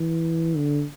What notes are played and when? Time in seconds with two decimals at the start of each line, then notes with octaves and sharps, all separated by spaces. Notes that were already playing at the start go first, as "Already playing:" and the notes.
Already playing: E3
0.56 D3